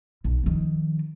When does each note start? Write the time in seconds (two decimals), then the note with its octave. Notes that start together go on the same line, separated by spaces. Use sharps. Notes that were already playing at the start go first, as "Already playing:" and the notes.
0.24 B1
0.43 D#3 F3